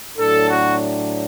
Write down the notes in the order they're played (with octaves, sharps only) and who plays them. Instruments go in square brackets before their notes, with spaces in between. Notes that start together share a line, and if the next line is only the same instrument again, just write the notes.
[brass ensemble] A2 F#3 D4 A4
F#4